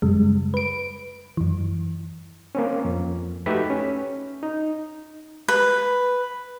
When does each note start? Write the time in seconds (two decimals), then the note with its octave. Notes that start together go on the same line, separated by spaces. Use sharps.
0.02 F#2 C#3 G3 G#3
0.54 B4 D7
1.37 F#2 E3
2.55 A#3 C4 C#4
2.85 F2
3.46 A3 D#4 F#4 G4 B4 E5
3.70 C#4
4.43 D#4
5.48 B4